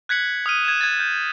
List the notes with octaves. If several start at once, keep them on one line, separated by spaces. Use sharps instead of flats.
F#6 G#6 B6 C#7 F#7
D#6 F6 D#7
G#6 E7
G#6 A6
G6